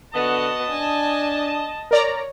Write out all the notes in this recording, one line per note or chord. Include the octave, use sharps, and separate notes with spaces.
D3 B3 F#4 D#5 A5
D4 G#5
A#4 C#5 D5 A#5